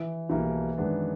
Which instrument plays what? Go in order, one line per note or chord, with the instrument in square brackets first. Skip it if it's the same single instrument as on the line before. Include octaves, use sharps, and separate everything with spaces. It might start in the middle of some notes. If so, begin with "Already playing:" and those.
Already playing: [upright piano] E3
[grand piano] B1 B2 G3 A#3 [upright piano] E3
[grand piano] F#2 D#3 G#3 B3 D4